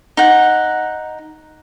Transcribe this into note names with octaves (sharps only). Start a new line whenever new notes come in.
D#4 F#5